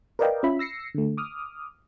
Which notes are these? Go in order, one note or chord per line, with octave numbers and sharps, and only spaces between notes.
A#4 B4 D5 D#5 F5 G5
C#4 F4 E5 B5
E6 A#6 C7 C#7
D3 A3
D6 D#6 F6